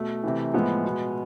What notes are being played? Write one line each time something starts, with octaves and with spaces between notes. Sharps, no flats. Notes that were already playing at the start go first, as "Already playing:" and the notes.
Already playing: B2 A3
C3 E3
A2 F3 G#3 B3
B2